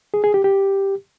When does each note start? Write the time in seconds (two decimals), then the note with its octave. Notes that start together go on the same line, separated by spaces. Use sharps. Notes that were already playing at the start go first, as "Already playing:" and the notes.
0.14 G#4
0.24 G#4
0.34 G4
0.44 G4